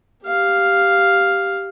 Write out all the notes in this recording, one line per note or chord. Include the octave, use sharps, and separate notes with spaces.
G4 F5